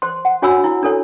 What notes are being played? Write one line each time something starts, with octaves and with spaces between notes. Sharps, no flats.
C5 C6
F#5
D4 F#4 C#5 G#5 B5 E6
E4
D4 A4 C#5